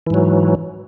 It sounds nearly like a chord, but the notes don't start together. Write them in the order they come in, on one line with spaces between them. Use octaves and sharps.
E3 G#2 F#3